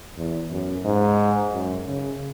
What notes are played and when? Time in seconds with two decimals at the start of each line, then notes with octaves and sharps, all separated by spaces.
0.17 E2
0.51 F#2
0.85 G#2
1.52 F#2
1.86 C#3